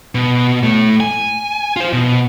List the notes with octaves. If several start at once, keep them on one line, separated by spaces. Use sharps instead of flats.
B2
A2 A3
G#5
F4 C5
B2